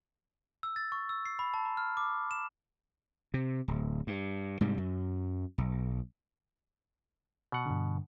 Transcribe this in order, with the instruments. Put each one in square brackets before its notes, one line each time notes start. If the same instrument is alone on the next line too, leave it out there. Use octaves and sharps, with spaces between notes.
[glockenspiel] E6
A6
C#6
E6
C7
B5
A5
A#5
F6
D6
E7
[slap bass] C3
D1
G2
G#2 C3 G3
F#2
B1
[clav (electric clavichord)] B2 F#5
[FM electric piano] G2 D3